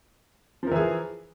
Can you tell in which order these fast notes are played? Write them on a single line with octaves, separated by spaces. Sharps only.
F3 A#4 E3 G#4